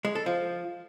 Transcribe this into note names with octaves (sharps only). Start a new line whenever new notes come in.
G#3
A4
F3